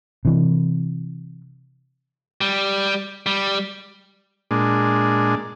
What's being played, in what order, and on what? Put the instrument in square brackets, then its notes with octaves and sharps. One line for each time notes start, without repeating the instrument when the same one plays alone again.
[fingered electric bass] C3 E3
[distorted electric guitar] G3
G3
[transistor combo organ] A#2 G#3 D4